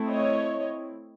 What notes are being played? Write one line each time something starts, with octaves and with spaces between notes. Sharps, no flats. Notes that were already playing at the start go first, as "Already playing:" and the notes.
Already playing: A3 C4 E4
C#5 D#5